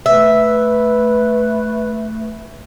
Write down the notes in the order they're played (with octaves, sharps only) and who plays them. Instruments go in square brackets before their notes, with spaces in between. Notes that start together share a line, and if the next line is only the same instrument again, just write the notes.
[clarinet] A3 [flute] B4 [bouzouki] E5